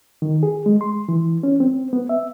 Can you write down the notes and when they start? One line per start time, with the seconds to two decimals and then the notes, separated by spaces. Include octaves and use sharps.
0.22 D#3
0.43 G#4
0.66 G#3
0.81 C6
1.09 E3
1.43 C#4
1.60 C4
1.93 B3
2.09 E5